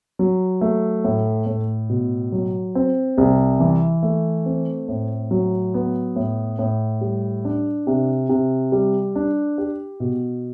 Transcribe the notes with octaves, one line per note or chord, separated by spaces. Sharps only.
F#3
A3
A2
A2
B2
F#3
C4
C2
E3
A3
C4
A2
F#3
B3
A2
A2
G3
D4
C3
C3
G3
D4
G4
B2